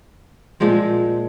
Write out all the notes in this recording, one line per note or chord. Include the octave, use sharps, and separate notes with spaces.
A#2 F3 G#3 C4